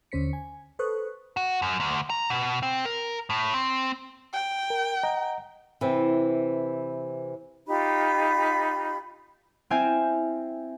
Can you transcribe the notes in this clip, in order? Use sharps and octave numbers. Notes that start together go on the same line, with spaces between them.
D#2 D3 C#4 C5 B6 C#7
G#5
A4 B4 C5 C#6 D#6 F#6
F#4
F#2
D2
A#5
B2
C4
A#4
A2
C4
G5
A#4
D#5 F#5 A#5
C3 E3
D#4 F4 G4 B5
C4 E4 E5 F5 G5 G#5